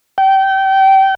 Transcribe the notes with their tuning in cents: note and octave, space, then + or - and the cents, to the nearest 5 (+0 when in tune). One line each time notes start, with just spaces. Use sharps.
G5 -25